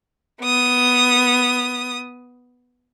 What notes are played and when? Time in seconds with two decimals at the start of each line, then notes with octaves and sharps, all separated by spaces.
0.42 B3 D#6